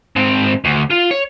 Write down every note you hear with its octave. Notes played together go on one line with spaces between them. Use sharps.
G#2 C4
D2
F4
C#5